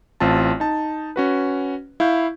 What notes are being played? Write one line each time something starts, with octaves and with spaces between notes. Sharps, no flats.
A1 C4 F4 A5
D#4 A5
C#4 F#4 B4
E4 F5 C#6 G6